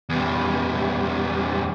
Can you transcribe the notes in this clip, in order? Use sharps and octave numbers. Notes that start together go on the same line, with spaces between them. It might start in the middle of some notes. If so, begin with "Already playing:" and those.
E2 G3